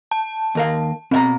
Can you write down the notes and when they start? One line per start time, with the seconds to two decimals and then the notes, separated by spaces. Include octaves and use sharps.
0.11 A5
0.55 D#2 A#4 F5
1.11 B2 C4 E5 A#5